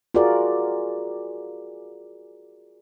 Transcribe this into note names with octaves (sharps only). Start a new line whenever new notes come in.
F4 F#4 G#4 A#4 D5